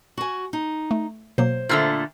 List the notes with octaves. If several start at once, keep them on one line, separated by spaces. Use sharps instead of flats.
F#4 G#5
D#4
A3
B2 F#3 A#3 C5
A#2 D3 A3 E6 F6 G6